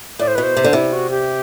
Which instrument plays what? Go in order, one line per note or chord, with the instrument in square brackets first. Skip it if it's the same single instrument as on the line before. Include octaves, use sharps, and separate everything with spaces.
[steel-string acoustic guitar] A2 [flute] D5
[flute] C5
[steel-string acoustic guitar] B2 [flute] B4
[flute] C5
[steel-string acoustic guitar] C3
D3
[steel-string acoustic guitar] C3 [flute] E4
[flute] F#4
G4